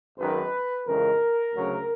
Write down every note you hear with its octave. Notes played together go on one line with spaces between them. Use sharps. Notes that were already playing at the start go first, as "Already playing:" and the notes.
G#1 F#2 D#3 B4
F2 C#3 E3 G#3 A#4
D2 C#3 F#3